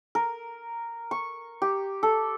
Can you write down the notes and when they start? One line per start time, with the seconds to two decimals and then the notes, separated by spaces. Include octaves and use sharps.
0.15 A#4
1.11 C#6
1.62 G4
2.03 A4